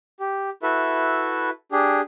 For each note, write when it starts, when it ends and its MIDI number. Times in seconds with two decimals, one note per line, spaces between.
0.20 0.50 67
0.63 1.50 64
0.63 1.50 66
0.63 1.50 69
0.63 1.50 71
0.63 1.50 76
1.72 2.01 62
1.72 2.01 67
1.72 2.01 68